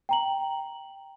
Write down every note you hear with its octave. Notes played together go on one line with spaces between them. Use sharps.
G5 A#5 F#7